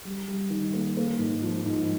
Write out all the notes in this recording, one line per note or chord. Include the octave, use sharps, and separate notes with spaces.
G3
G3
D#3
A#3
A#3
G#2
F3
G#2